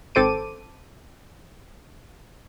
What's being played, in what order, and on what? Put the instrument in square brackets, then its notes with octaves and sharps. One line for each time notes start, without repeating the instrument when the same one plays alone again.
[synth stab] G#1 C4 A4 C5 D6 D#7